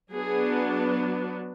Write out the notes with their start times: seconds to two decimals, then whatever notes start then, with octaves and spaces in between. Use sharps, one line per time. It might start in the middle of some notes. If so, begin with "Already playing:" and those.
0.12 F#3 B3 D4 G#4